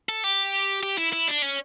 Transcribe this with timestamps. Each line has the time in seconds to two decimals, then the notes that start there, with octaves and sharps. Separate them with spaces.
0.09 A4
0.24 G4
0.83 G4
0.98 E4
1.13 E4
1.28 D4
1.42 C#4